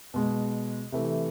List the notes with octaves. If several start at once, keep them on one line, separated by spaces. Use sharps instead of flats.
B2 G#3
C3 E3 A3